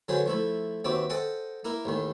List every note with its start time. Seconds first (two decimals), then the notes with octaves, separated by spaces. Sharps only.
0.08 D3 F#3 F#4 G#4 B4 C5
0.26 F3 A3 E4
0.84 D#2 C4 F#4 B4 E5 D6
1.10 A4 C5 D#5 F#5 G5
1.65 A#3 E4 A#4
1.85 A1 D#2 D#3